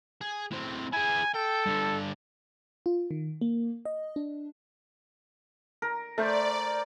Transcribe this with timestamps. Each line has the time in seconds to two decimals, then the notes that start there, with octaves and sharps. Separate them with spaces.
0.21 G#4
0.52 A2 C4
0.93 E4 G#4 G#5
1.34 A4 G5
1.66 G2 D3
2.86 F4
3.11 D#3
3.41 A#3
3.85 D#5
4.16 D4
5.82 A#4
6.18 A3 A#4 C5 D5